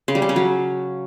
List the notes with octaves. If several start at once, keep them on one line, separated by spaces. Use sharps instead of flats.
C#3
G3
C#3
C#4
F#3